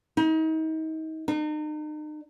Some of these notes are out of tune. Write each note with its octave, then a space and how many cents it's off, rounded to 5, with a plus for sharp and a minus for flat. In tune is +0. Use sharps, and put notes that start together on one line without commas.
D#4 +35
D#4 -40